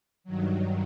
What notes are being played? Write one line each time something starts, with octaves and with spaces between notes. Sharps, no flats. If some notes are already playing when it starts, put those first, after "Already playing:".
G2 D#3 F#3